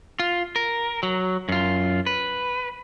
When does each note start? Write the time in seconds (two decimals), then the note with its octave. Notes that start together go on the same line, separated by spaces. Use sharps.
0.19 F4
0.56 A#4
1.03 F#3
1.49 F#2 F4
2.06 B4